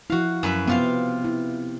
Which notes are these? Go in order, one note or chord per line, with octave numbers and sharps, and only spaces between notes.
F3 E4 F#4 F5
F#2 B4 E5
C3 B3 F4 F5
E4